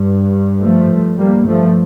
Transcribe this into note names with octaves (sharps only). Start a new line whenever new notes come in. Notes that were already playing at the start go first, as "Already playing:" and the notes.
Already playing: G2
F3 A3
G2
G3 A#3
F3 A3